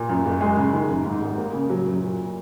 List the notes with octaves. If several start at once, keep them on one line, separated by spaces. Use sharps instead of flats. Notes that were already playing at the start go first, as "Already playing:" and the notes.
Already playing: A#2
F#2
F#1
G#3
C#3
D#3
F#2
G#2
G#1
A#3
C#3
F#3
F#2
A#2